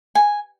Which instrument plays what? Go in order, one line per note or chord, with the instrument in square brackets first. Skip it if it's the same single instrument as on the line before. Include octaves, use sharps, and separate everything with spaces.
[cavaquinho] G#5